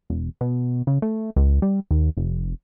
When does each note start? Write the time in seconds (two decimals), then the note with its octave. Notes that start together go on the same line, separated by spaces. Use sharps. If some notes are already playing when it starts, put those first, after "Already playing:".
0.10 E1
0.41 B2
0.87 C#3
1.02 A3
1.36 C#2
1.62 G3
1.91 D#2
2.17 F1